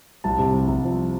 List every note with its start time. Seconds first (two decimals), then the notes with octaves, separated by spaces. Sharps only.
0.24 C2 A5
0.39 C3
0.54 C2
0.68 C2
0.84 F3